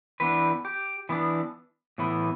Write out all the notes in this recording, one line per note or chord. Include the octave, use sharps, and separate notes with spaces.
E3 B3 D4 B4
G4
E3 B3 D4
A2 E3 B3